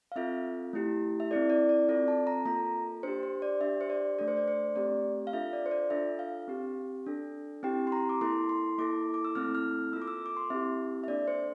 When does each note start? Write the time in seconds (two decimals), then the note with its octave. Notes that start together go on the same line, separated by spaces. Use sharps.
0.12 F5
0.16 C4 F4 A4 E5
0.73 A3 E4 G4
1.20 E5
1.31 C4 E4 A4 D5
1.50 D5
1.69 D5
1.88 C4 F4 A4 D5
2.08 A5
2.27 A#5
2.45 A#3 F4 A4 A#5
3.03 D4 G4 C5
3.23 C5
3.42 D5
3.61 D4 G4 E5
3.81 C5
3.90 D5
4.18 A3 D4 A4 D5
4.28 C5
4.37 D5
4.48 C5
4.76 A3 C4 G4 D5
5.27 F5
5.33 D4 F4 A4 E5
5.53 D5
5.66 C5
5.71 D5
5.90 D4 F4 A4 E5
6.19 F5
6.48 C4 G4
7.06 D4 A4
7.63 C4 E4 G4 G5
7.87 C6
7.92 A#5
8.09 D6
8.21 A#3 E4 A4 C6
8.49 C6
8.78 A#3 E4 A4 D6
9.14 D6
9.25 E6
9.35 A3 C4 E4 A4 F6
9.55 F6
9.93 A#3 F4 A4 E6
10.02 D6
10.08 E6
10.26 D6
10.37 C6
10.50 C4 E4 G4 E5
11.04 E5
11.08 A#3 D4 A4 D5
11.28 C5